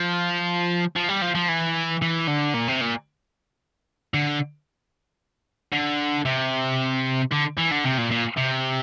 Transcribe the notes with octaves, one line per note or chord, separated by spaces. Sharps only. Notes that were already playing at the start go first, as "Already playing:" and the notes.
Already playing: F3
F3
G3
F3
F3
E3
E3
D3
A#2
C3
A#2
D3
D3
C3
D3
E3
D3
C3
A#2
A#2
C3